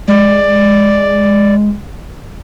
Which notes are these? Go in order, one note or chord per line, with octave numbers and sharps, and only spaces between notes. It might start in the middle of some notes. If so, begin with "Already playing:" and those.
G#3 D5